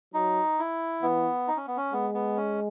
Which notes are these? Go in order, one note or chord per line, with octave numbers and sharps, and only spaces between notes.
F#3 D#4
E4
E3 B3
D#4
C#4
B3
C#4
G#3 B3
B3
C#4